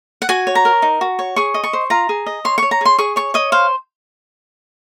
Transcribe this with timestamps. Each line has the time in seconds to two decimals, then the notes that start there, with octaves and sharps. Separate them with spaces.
0.22 F#5
0.29 F#4 G#5
0.47 C#5
0.55 A#5
0.65 A#4
0.82 D#4
1.01 F#4
1.19 C#5
1.36 G#4 C#6
1.54 D#5
1.64 C#6
1.73 C5
1.90 F4 A#5
2.09 G#4
2.26 D#5
2.45 C#5 C6
2.58 C#5 C#6
2.71 A#5
2.81 G#4 C6
2.98 G#4 C#6
3.16 C#5 C#6
3.34 C#5 D#5
3.52 C5 F5